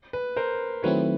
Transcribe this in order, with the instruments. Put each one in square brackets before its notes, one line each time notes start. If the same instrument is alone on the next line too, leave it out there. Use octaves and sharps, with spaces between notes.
[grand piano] B4
A#4 C5
[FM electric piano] D#3 F#3 A3 C4 E4 [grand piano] B4 C#5